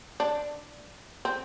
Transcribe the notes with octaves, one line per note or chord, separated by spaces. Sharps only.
D4
C4